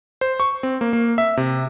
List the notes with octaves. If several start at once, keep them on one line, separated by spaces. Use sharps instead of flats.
C5
C#6
C4
A#3
A#3
E5
C3